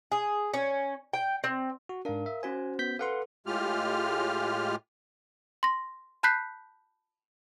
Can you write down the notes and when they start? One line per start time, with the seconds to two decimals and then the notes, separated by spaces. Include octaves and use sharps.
0.12 G#4
0.54 C#4
1.13 G5
1.44 C4
1.89 F#4
2.05 G#2 D4 A#4 F5
2.26 E5
2.43 C#4 F#4 C5 G#5
2.79 B3 G6 B6
2.99 A4 B4 F5 F#5 C6
3.46 A2 G#3 F4 G4 F6
5.63 C6 A#6
6.23 A5 B5 F#6 G6 B6 C7